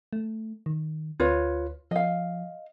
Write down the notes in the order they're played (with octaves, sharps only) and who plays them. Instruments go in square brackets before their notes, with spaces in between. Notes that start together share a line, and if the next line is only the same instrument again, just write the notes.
[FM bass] A3
D#3
[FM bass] D2 [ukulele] F4 B4 C#5
[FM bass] F3 [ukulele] D#5 F5